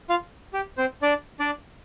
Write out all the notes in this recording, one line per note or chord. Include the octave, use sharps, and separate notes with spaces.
F4 F5
G4
C4 C5
D4 D5
D4 D5